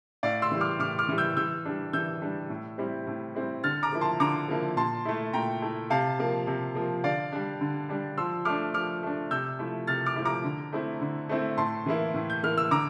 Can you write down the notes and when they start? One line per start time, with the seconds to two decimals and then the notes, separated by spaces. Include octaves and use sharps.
0.23 A2 D5 F5
0.42 C6 E6
0.51 E3 G3
0.61 D6 F6
0.80 A2 D6 F6
0.99 D6 F6
1.09 E3 G3
1.18 E6 G6
1.37 E3 E6 G6
1.65 G3 D4
1.93 E3 E6 G6
2.22 G3 D4
2.50 A2
2.78 G3 C4 E4
3.07 A2
3.35 G3 C4 E4
3.64 D3 F6 A6
3.83 A#5 D6
3.92 F3 A#3 E4
4.01 A5 C6
4.20 D3 A#5 D6
4.48 F3 A#3 E4
4.77 A#2 A5 C6
5.05 A3 E4
5.33 A#2 G5 A#5
5.62 A3 E4
5.90 C3 F5 A5
6.19 F3 A#3
6.47 C3
6.75 F3 A#3
7.04 D3 D5 F5
7.32 G3 D4
7.61 D3
7.89 G3 D4
8.17 F3 C6 E6
8.45 A3 D4 D6 F6
8.74 F3 D6 F6
9.03 A3 D4
9.31 C3 E6 G6
9.59 F3 A3 E4
9.87 C3 F6 A6
10.06 D6 F6
10.16 F3 A3 E4
10.25 A#5 D6
10.44 D3
10.72 A3 C4 E4
11.01 D3
11.29 A3 C4 E4
11.57 A2 A5 C6
11.86 E3 A#3 E4
12.14 A2
12.30 G6
12.43 E3 A#3 E4 F6
12.57 E6
12.71 D3 A#5 D6